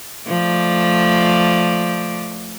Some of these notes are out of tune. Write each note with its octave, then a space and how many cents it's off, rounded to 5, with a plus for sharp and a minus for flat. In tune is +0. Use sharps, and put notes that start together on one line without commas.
F3 +0 A3 +0 D5 +0